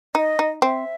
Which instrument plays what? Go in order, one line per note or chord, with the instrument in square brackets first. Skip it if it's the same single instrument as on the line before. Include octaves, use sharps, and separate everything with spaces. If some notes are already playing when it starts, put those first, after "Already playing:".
[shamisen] D#4 [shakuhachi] D#5
[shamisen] D#4
[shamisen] C4 [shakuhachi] E5